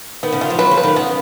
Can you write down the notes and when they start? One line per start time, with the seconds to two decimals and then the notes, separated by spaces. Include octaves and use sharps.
0.23 D#3 B3
0.32 C#3
0.41 D#3 F4
0.50 F3
0.59 F#3 B4
0.71 F3
0.77 B4
0.83 D#3
0.96 C#3 B3